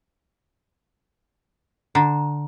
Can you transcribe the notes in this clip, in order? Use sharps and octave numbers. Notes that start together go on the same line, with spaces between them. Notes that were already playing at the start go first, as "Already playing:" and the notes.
D3 A#5